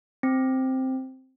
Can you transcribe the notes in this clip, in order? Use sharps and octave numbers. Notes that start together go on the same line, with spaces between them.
C4